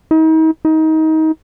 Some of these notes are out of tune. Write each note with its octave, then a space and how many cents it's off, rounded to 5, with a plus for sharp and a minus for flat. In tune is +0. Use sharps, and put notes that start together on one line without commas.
D#4 +40
D#4 +25